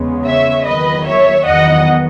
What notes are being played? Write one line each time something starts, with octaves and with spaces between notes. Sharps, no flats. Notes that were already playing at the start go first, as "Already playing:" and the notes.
Already playing: E2 C#3 G#3 B3
C#5 E5
E2 D#3 F#3 A#3 B4 D#5
C#5 E5
E2 D#3 F#3 B3 D#5 F#5